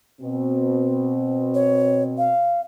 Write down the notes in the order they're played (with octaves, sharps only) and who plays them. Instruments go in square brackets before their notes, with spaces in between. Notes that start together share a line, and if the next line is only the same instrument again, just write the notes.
[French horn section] B2 C4
[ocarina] C#5
F5